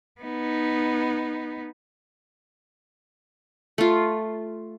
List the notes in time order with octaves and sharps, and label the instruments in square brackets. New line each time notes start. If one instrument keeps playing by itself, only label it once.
[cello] B3 D#4
[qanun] A3 F4